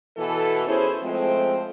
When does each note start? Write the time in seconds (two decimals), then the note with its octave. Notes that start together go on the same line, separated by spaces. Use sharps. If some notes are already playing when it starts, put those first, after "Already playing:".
0.17 B2 E3 A4
0.67 C#4 E4 G#4 C5
1.03 F3 G#3 A3 C4